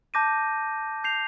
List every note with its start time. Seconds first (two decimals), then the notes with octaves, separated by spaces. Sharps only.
0.14 A5 D6 G6 A#6 D#7
1.04 G6 C7 F7